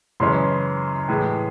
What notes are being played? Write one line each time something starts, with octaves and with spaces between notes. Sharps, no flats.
F#2 C#3 E3 G#3 C#4 C6
A2 E3 G#3